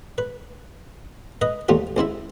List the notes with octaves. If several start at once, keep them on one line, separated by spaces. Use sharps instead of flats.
B4
B4 D#5
D#2 G3 A3 C4 F4 G4
C#2 C4 E4 E5